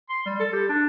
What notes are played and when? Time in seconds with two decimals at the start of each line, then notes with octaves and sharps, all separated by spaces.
0.09 C6
0.26 G3
0.39 A4
0.53 G4
0.69 D4